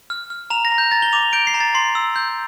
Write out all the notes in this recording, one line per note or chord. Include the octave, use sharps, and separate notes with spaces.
F6
F6
A#5 F7
A#6
A#5
G6
A#5 A6
G7
D6 F7
G6 D7
C7
A#5
A6
C6 C7
E6
G6